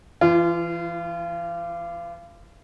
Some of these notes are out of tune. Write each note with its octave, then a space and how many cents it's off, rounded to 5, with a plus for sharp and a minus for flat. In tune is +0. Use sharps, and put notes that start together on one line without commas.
E3 +30 F4 -30